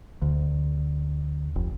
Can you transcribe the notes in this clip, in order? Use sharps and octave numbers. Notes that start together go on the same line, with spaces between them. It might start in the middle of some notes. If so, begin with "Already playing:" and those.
D2
F1